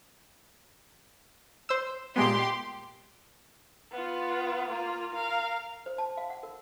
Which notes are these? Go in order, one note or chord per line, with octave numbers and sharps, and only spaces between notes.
C5 E6
A#2 G#3 B3 G4 C6
B3 F4
A#3 F4
A#4 F5
C5
A5
F5
F#5
A#4